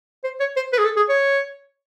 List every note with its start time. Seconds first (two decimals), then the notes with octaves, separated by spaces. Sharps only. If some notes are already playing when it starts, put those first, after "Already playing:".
0.24 C5
0.40 C#5
0.56 C5
0.73 B4
0.78 G#4
0.85 A4
0.96 G#4
1.09 C#5